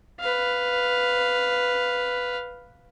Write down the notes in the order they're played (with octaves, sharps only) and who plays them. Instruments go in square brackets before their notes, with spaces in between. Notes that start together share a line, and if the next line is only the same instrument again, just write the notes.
[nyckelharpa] B4 F5